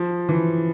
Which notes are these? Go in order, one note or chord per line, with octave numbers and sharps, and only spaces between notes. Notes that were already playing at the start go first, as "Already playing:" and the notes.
Already playing: F3
E3